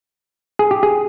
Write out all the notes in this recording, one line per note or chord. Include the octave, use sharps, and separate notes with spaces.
G#4
G4
G#4